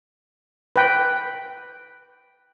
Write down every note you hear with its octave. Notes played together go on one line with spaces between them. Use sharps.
B4 G5